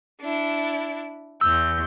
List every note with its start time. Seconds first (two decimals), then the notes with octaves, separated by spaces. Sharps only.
0.20 D4 E4
1.41 E2 E6 G6